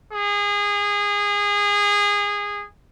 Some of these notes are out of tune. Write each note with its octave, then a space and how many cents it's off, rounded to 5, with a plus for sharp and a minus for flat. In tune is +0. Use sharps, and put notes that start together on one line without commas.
G#4 -25